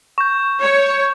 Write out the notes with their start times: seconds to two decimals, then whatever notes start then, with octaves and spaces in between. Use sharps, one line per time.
0.18 C#6 G6
0.61 C#5